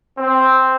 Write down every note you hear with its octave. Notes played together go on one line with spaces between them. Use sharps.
C4